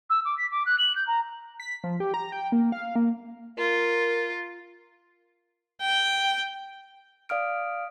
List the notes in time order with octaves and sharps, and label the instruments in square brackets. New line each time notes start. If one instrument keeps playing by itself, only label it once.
[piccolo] E6
D6
B6
D6
F#6
F#7
G6
A#5
[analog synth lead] B6
F3
G4
A#5
G5
A#3
F5
A#3
[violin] F4 [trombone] A#4
[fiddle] G5
[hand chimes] D5 F5 D#6 F6 D7